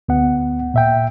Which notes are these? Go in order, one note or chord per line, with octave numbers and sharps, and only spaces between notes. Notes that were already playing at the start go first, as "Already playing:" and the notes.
D2 B3 F#5
A#2 E5 G5